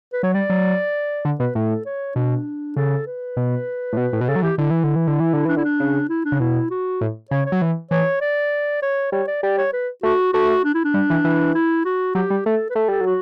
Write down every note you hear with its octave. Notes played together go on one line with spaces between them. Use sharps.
B4
F#3 C#5
G3 D5
F#3
D3
B2 B4
A2 A4
C#5
B2 D4
C#3 A4
B4
B2
A2
B2
A2
B2
C#3 A4
F#3
E3 G4
D3 E4
E3
D3
E3
D3
E3
D3
E3 D4
D3 E4
D4
C#3
E4
D4
C#3
B2 E4
F#4
A2
C#3 C#5
C#5
F#3
E3
E3 C#5
D5
C#5
G3 C#5
D5
G3 D5
C#5
B4
A3 F#4
A3 F#4
D4
E4
D4
G3
E3
E3
E4
F#4
F#3 G4
G3
A3 A4
B4
A3 A4
G3 A4
F#3
F#4